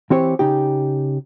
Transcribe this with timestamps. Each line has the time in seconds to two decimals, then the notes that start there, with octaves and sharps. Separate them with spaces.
0.10 E3 C4 G4 C#5
0.39 C#3 D#4 G4